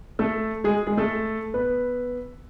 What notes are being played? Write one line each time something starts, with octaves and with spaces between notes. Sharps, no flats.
A3 A4
G#3 G#4
G#3 G#4
A3 A4
B3 B4